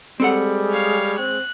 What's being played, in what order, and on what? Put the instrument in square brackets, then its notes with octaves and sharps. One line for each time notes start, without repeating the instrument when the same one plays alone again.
[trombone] G3 [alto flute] G#3 [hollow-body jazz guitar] C4 A4 F#5
[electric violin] C#5 F5
[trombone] C4 [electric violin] F#6